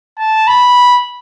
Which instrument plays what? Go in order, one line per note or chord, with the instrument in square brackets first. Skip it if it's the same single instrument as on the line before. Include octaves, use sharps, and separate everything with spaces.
[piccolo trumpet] A5
B5